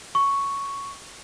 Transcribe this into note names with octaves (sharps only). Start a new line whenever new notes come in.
C#6